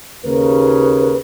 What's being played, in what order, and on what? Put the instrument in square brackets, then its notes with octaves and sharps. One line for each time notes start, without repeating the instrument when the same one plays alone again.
[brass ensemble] D#2 C#3 A#4 [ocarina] B4